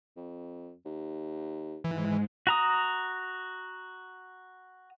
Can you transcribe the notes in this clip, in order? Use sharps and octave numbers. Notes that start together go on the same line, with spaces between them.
F2
D#2
G#2 E3 G#3
F#4 A#5 D#6